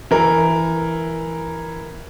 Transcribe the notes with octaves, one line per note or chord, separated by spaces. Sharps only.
E3 A#4